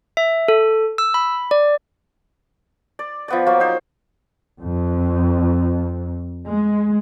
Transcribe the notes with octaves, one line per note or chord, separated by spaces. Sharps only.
E5
A4
E6
B5
D5
D5
F3 B3 D5
F3 F#3 A#3
D#4 C5
F2
G#3